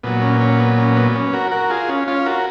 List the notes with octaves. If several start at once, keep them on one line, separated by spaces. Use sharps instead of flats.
A#2 F#3 B3
C#4
C#4
B3
C#4
B3
C#4
F#4 A#4
F#4 A#4
F4 G#4
C#4
C#4 F4
F#4 A#4